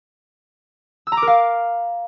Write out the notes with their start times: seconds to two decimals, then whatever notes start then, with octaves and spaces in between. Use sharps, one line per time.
1.07 E6
1.12 A#5
1.17 D6
1.22 A#4
1.27 F5